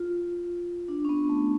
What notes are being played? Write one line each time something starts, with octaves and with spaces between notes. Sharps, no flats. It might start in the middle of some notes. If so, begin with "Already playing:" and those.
Already playing: F4
D4
C#4
B3
A3